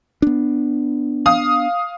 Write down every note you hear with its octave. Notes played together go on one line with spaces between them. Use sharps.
B3 D4
F5 D#6